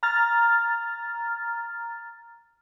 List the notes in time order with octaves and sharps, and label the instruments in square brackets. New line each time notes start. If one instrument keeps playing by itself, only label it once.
[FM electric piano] A#5 F6 A6